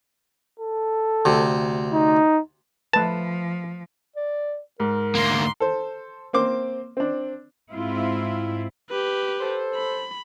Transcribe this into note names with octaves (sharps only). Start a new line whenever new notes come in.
A4
D2 C3
D#4
F3 A3 B4 A5
D5
G#2 A#4
D2 A#3 C6
A4 C5
A#3 C4 C6 D6
C4 D4
G#2 C4 E4 F4
G4 B4
A4 C5
B5